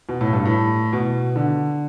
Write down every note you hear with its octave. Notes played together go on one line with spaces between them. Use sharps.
B2
A2
G2
A2
B2
D3